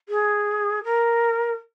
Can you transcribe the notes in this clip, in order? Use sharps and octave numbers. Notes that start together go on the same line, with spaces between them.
G#4
A#4